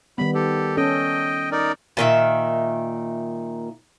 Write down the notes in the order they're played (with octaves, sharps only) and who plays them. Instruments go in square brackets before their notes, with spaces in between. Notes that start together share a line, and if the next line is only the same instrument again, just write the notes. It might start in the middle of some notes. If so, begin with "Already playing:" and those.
[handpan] D#3 G3 B3 [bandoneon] B5
[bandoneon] G4 A4
[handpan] C#4 A4 [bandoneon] D#5 G5
[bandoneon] D#4 A#4 D5
[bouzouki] A#2 D#3 E5